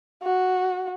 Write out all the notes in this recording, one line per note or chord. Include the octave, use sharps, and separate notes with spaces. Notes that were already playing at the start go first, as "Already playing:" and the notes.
F#4